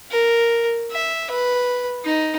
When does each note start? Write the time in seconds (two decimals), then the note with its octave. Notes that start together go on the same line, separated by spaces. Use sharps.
0.11 A#4
0.91 E5
1.30 B4
2.05 D#4